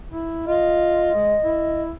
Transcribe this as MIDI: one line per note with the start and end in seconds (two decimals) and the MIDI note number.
0.11 0.46 64
0.47 1.14 65
0.47 1.82 75
1.15 1.35 56
1.44 1.92 64